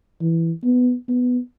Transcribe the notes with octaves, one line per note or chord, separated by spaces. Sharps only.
E3
B3
B3